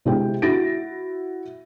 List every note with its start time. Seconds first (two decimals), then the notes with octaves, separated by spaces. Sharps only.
0.05 C3 G#3 E4 G4 C5 G5
0.42 E4 F#4 A6 A#6 D7